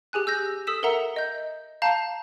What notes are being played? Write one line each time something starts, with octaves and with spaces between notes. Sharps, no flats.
G4 G#4 G#5 F#6
E6 G6 A#6
A4 D#6 E6 B6 E7
A4 A#4 E5 F#5 A#5 C#7
D#5 G6
F5 A5 A#5 G6